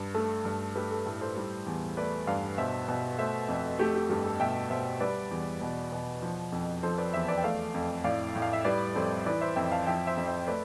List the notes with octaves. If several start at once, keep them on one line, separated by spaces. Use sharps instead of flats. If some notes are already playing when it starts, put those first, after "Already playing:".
Already playing: G2
A3 A4
G2
A3 G4 B4
A4
A2 A4
A4 C5
G3
E2
A3 B4 D5
G2 D5 F5
B2 C5 E5
B2
A3 C5 E5
F2
A3 G4
G4
G2 G4
A4
B2 E5 G5
B2 C5 E5
G3 B4 D5
E2
B2
B2
F3
F2
F3 A4 C5
B4 D5
E2 C5 E5
B4 D5
G5
A3 D5 F5
F2
A2 D5 F5
A2
F5
E5
G3 B4 D5
F2 A4 C5
E3 B4 D5
C5 E5
F2 E5 G5
F5 A5
F3 E5 G5
C5 E5
F2
C5 E5
A3 B4 D5